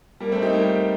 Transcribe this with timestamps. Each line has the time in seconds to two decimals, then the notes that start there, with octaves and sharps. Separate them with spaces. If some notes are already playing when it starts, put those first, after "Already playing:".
0.20 G3 A#3
0.32 A3 C4
0.42 D#4 G4
0.53 G3 A#3